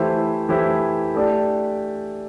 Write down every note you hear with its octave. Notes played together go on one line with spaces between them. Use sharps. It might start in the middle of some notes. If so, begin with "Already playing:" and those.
Already playing: E3 A3 E4 G4 C5
E3 A3 E4 G4 C5
A3 D4 G4 D5